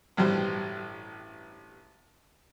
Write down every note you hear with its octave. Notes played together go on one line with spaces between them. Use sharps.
A1 G2 B2 G3 C5